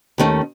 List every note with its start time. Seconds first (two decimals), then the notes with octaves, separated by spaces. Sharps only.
0.18 D#2 D#3 A3 C#4